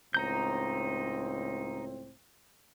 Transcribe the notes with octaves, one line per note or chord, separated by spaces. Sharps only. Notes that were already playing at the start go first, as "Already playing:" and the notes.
C#2 A2 C4 D#4 A#5 G6